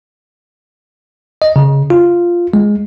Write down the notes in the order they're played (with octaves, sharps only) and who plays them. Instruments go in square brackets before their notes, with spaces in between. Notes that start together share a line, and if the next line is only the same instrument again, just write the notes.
[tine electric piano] D#5
C#3
F4
G#3